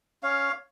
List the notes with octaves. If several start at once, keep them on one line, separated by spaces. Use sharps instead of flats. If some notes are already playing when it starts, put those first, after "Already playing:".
C#4 C#5 F5